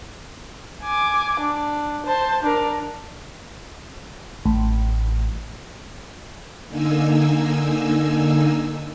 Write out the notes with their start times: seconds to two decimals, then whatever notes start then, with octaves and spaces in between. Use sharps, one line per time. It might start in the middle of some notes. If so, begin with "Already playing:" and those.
0.83 G#5 D6
1.40 D4
2.06 C5 A5
2.42 D4 A#4
4.45 A1
6.67 D3 A#3 D#4 G#5 E6